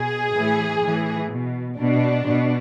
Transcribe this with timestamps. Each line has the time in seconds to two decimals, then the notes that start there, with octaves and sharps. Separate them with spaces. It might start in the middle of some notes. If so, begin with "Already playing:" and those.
Already playing: B2 G#4
0.34 A2 E3
0.82 A2 E3
1.30 B2
1.78 B2 D4
2.26 B2